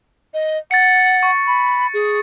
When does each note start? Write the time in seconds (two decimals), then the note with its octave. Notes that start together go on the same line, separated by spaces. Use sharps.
0.34 D#5
0.71 F#5 A6 C#7
1.23 C#6
1.47 B5
1.94 G#4